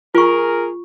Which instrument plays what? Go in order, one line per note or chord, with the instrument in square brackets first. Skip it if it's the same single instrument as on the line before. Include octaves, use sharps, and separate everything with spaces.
[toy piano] F4 C#6 [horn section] G#4 A#4